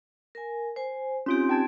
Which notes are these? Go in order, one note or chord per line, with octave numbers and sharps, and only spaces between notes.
A#4 G#5
C5 G#5
C4 C#4 D#4 F4 G4 D7
G5 A5 G#6